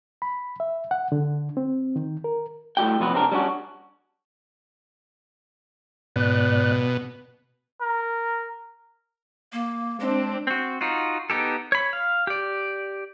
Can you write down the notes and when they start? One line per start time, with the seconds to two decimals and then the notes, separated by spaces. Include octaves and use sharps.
0.22 B5
0.60 E5
0.91 F#5
1.12 D3
1.57 C4
1.96 D#3
2.24 A#4
2.77 A2 G3 F#4 G5
3.00 C3 F3 F#3 B3 B4
3.14 C3 C4 D4 A#4
3.32 G3 C#4 D4 F#4
6.16 G#2 B2 D5 F#6
7.81 A#4
9.53 A#3
10.00 G#3 C4 D4
10.47 C4 F#4
10.81 D#4 F4 F#4
11.30 B3 D#4 G4 A4
11.72 C#5 B5
11.93 F5
12.27 G4 D5